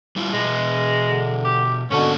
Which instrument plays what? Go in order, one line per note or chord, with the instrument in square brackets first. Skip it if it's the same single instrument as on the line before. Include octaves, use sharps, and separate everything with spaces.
[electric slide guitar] G3 E4 F4
[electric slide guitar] B2 G#4 [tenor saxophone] G#3
[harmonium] D3
[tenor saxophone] G4
[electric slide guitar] G#2 A#3 A5 [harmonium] B2 D3 [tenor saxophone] C#4